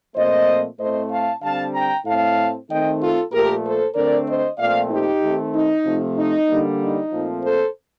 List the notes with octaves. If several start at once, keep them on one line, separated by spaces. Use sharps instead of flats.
A#2 F3 A3 C4 C5 D#5
A2 A3 C4 C5 D#5
F5 A5
D3 G3 C4 F5 A5
G5 A#5
A2 A3 C4 F5 A5
D#3 A3 C4 D#5 G5
F4 A4
A#2 F3 A3 G4 A#4
A4 C5
D3 A3 C4 A#4 D5
C5 D#5
A#2 F3 A3 C4 D5 F5
D#4 G4
D#3 A3 C4
D#4
C3 F3 A3
D#4
D3 G3 A#3
D#4
A#2 F3 A3 C4
A4 C5